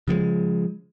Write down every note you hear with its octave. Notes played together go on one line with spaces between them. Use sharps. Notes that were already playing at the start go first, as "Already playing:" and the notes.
C#3 F3 G3 G#3